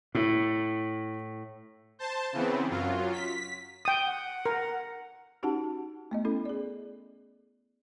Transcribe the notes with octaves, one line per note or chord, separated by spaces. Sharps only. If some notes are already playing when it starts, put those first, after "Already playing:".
A2 E4
C5 A5
C#3 E3 B3 C4
F#2 F#3 F4
B6
G5 D#6
F#5
A#4
C#4 D#4 F#4 G4 F#5 A5
A3 B3 D#5
C#4 E4 A4
G#4 D5